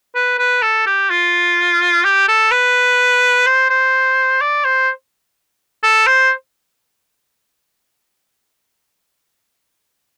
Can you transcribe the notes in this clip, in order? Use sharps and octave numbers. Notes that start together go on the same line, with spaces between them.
B4
B4
A4
G4
F4
G4
A4
B4
C5
C5
D5
C5
A4
C5